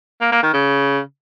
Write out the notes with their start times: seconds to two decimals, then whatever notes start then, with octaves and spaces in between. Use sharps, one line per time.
0.21 A#3
0.32 A#3
0.43 D#3
0.54 C#3